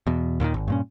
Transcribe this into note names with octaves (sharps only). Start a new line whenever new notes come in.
E2 B2
D#2 A#2 D3 D#3
G#1
G2 A#2 C#4